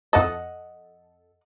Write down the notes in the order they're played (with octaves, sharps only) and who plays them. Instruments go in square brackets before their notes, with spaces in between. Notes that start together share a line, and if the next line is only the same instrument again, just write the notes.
[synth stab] F2 A4 [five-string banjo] D#5 F#5